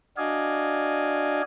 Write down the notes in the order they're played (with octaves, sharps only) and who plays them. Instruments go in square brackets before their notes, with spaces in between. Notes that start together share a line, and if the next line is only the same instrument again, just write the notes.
[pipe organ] D4 F#4 D5 D#5 F5 G#5